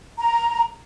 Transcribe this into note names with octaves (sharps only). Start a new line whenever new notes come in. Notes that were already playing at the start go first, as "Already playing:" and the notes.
A#5